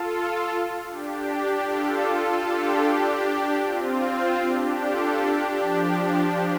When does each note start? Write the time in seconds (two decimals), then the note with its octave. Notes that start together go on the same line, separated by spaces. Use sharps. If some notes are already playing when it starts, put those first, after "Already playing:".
Already playing: F4 A4
0.88 D4 G4
1.67 F4 A4
2.46 D4 G4
3.64 C4 F4
4.43 D4 G4
4.83 F4 A4
5.22 D4 G4
5.61 F3